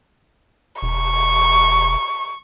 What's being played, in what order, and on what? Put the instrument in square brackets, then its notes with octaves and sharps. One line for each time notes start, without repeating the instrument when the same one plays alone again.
[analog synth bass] E1 [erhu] C#6